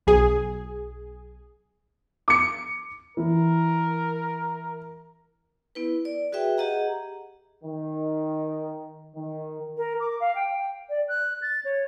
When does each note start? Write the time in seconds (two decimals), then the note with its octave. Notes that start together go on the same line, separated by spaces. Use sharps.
0.07 B1 G#4
2.28 D6 C#7
3.17 E3 A#4
5.75 B3 E4 B4
6.05 D5
6.32 F#4 G#4 B4 E5 G5
6.58 G4 G#4 D#5 F#5 A#5
7.64 D#3
9.16 D#3
9.77 A#4
10.00 D6
10.20 F5
10.35 G5
10.90 D5
11.08 F#6
11.42 A6
11.65 C#5